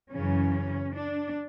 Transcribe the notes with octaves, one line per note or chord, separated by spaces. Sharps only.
F#2 C#3 E3 C#4
D4